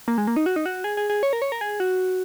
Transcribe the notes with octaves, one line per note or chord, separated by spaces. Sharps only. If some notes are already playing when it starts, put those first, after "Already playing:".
A#3
G#3
A#3
D#4
F#4
D#4
F#4
G#4
G#4
G#4
C#5
A#4
C#5
A#4
G#4
F#4